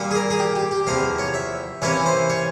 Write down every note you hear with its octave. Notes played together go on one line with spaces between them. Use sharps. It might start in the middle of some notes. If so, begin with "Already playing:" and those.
Already playing: A#2 G3 A#3
G#4
A#4
G#4
G4
G4
G4
E2 C3 F3 A#3 F5
C#5
E5
C3 E3 A#3 C#4 E4 C#5
C5
C#5